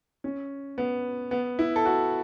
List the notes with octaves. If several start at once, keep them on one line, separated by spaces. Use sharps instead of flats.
C#4
B3
B3
E4
A4
F#4